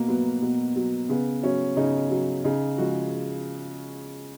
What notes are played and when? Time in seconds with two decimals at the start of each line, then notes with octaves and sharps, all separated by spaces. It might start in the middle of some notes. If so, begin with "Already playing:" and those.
Already playing: B2 A#3
0.08 F#3 B3
0.42 B2
0.76 F#3
1.09 C#3 B3
1.43 F#3 C#4
1.77 C#3 D#4
2.11 F#3
2.44 C#3 D#4
2.78 F3 G#3 F#4